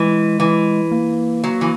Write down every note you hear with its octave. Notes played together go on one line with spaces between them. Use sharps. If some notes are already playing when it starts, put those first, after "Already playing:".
Already playing: E3 G#3
E3
A#3
F#3
E3